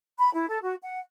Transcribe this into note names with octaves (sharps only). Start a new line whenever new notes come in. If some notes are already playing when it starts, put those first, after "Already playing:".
B5
E4
A4
F#4
F#5